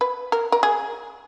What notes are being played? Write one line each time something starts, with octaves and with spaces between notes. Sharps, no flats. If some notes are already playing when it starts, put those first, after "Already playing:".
B4
A#4
A#4
G#4